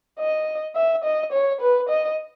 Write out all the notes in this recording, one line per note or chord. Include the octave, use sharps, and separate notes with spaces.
D#5
E5
D#5
C#5
B4
D#5